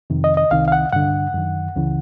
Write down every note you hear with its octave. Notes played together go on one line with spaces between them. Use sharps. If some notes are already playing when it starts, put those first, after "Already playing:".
F2 C3 D#3
D#5
D#5
C2 C3 D#3 F5
F5
F#5
G2 D3 F#5
F#2 D#3
C#2 C#3 E3